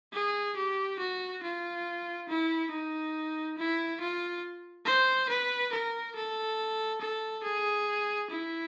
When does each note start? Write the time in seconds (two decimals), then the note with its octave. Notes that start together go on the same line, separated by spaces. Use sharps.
0.13 G#4
0.56 G4
0.99 F#4
1.43 F4
2.29 E4
2.71 D#4
3.58 E4
4.01 F4
4.86 C5
5.29 B4
5.72 A#4
6.15 A4
7.01 A4
7.44 G#4
8.30 E4